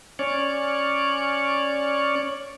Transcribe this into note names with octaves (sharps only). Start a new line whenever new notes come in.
C#4 C#5 D5